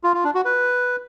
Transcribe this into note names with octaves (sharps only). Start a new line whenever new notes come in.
F4
F4
D4
F#4
B4